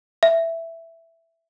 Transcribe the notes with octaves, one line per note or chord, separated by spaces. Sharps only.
E5